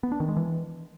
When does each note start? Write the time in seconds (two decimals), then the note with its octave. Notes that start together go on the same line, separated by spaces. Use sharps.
0.03 B3
0.12 D4
0.20 D#3
0.28 G#3
0.37 E3